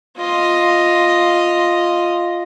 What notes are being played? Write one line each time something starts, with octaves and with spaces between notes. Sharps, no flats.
F4 D#5